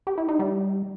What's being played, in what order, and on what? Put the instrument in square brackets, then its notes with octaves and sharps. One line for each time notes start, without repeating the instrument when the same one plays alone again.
[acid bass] G4
E4
D#4
G3